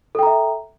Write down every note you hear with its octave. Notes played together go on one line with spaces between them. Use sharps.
A4 E5 G5 A#5